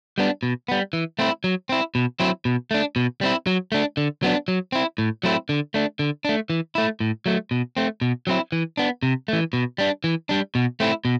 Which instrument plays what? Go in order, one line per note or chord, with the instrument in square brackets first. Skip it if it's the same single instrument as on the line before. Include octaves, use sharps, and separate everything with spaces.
[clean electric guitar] G3 B3 D4
B2
G3 B3
E3
A3 C4 E4
F#3
C4 E4
B2
F#3 C4 E4
B2
A3 D4
B2
G3 C4 E4
F#3
A3 D4
D3
F#3 B3 D4
F#3
C4 E4
A2
F#3 A3 C4 E4
D3
A3 D4
D3
A3 D4
E3
A3 E4
A2
F#3 A3
B2
A3 C4
B2
F#3 C4 E4
E3
B3 D4
C3
E3 A3
B2
G3 D4
E3
G3 D4
B2
A3 C4 E4
B2